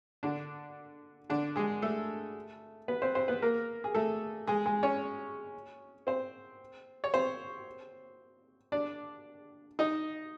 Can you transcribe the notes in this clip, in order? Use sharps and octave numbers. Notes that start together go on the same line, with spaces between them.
D3 D4
D3 D4
G#3 G#4
A3 A4
B3 B4
C4 C5
C4 C5
B3 B4
A#3 A#4
G#4
A3 A4
G#3 G#4
G#3 G#4
C#4 C#5
C4 C5
C#5
C4 C5
D4 D5
D#4 D#5